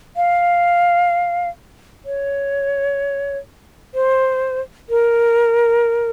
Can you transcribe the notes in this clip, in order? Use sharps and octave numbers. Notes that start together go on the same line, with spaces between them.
F5
C#5
C5
A#4